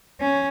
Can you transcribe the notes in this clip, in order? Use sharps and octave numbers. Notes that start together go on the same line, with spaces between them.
C#4